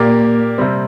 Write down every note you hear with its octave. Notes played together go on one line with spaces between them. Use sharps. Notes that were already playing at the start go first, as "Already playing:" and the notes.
Already playing: A#2 A#3 G4 A#4 D5
C3 G3 C4